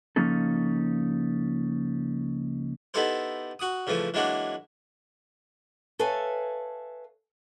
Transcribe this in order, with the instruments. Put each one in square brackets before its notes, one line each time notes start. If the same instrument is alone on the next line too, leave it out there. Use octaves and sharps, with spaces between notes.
[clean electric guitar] C#2 F3 A#3 C#4 D#4 A4
[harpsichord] B3 D#4 E4 G4 A4 C5
F#4 D#6
C#3 E3 F3 A3
E3 F#3 G#3 A#3 D4 F#4
[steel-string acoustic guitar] A4 B4 C#5 E5 F5 G#5